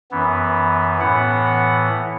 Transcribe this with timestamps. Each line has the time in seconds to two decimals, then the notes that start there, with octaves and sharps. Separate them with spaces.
0.11 F#2 E3 B3
1.00 A2 E3 B3 F#5
1.45 F#5